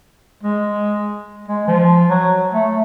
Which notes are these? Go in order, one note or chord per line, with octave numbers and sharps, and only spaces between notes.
G#3
G#3
F3
F#3
A3